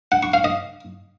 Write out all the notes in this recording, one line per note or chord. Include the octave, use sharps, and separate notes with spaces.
F#5
C#6
F5
D#5